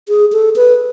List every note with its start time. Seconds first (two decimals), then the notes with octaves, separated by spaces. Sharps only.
0.09 G#4
0.33 A4
0.56 B4